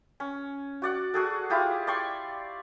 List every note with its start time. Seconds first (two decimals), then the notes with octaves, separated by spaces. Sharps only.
0.20 C#4
0.82 F#4 D5 F#5
1.14 F#4 G#4 A4
1.50 E4 F4 G4 G#4
1.87 D5 G5 C6 C#6